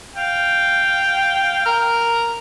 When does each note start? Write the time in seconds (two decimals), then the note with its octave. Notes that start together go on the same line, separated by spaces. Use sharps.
0.16 F5 G5
1.66 A#4 F6